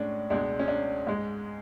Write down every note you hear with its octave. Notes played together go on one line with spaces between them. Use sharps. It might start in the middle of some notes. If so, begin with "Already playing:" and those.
Already playing: A2 G#3 C#4 D4
C#2 B2 G#3 D4
C#4
D4
G#2 G#3